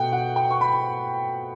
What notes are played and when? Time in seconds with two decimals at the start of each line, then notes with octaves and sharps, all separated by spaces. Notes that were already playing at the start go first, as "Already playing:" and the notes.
Already playing: B2 A3 F#5 G5
0.12 F#5
0.36 G5
0.51 C#6
0.61 B5